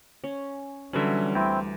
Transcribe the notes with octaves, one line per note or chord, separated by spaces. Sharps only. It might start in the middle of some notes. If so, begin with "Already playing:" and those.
C#4
D3 E3 F#3 G3 C#4 B4 E5
D2 C4 E4 G5